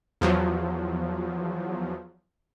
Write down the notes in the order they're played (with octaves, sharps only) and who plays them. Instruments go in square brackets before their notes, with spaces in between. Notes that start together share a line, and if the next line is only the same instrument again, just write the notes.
[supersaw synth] E2 F3 F#3